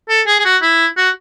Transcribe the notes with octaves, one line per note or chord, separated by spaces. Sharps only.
A4
G#4
G#4
F#4
E4
F#4